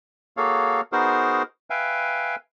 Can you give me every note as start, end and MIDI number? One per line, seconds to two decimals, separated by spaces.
0.37 0.81 58
0.37 0.81 66
0.37 0.81 68
0.37 0.81 69
0.37 0.81 73
0.37 0.81 77
0.92 1.43 59
0.92 1.43 63
0.92 1.43 66
0.92 1.43 68
0.92 1.43 70
0.92 1.43 72
1.70 2.36 71
1.70 2.36 76
1.70 2.36 77
1.70 2.36 79
1.70 2.36 80